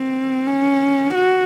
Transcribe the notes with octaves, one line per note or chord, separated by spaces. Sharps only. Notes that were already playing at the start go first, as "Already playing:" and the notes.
Already playing: C4
C#4
F#4